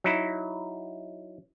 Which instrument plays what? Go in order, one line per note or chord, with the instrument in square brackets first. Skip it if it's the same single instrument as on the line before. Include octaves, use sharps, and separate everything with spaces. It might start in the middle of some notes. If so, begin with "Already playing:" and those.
[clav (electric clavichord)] F#3 D#4 E4